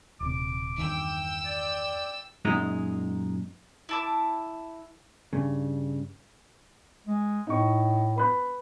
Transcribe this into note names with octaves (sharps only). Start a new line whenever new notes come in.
D#1 C3 D6
E2 G2 D#3 G5 E6
D5
F#2 A#2 G#3 D#4
E4 A5 D6
G2 C#3
G#3
A2 D#4 C#6
B4 B5 F#6